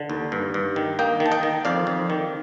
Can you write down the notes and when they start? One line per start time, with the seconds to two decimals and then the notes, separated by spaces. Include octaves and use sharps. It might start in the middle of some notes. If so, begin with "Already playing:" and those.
Already playing: D3
0.10 D#2
0.32 G2
0.54 G2
0.76 D#3
0.99 A#3 D#5 G5
1.20 D#3
1.26 A5
1.32 D#5 G5
1.43 D#3
1.65 F2 D5 F5
1.87 F2
2.10 D#3